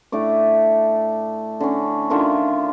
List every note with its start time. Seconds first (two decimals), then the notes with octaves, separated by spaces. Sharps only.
0.12 A2 A3 D4 D6
1.60 D3 C#4
2.10 D3 D#3 F4 E5